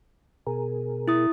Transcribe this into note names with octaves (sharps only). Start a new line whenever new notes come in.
B2 G#4 A#4
E4 D#6